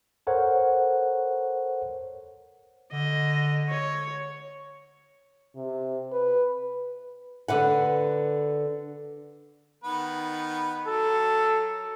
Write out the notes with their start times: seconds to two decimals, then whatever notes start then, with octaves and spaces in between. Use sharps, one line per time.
0.27 A4 A#4 C5 C#5 F#5
2.93 D3 D#5
3.69 C#5
5.56 C3
6.12 B4
7.48 D3 B4 F#5
9.84 D#3 B3 B4
10.87 F#3 A4 A#4